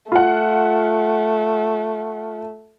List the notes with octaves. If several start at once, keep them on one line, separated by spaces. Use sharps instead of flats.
A3 F4 F#5